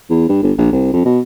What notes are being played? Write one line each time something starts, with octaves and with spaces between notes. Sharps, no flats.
E2
G2
G1
A#1
C2
F2
B2